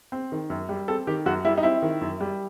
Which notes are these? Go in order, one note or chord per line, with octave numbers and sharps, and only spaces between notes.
C4
D#3
F#2
G3
C4 A4
D#3 G4
F#2 F#4
G3 E4
D#4
C4 E4
D#3
F#2
G3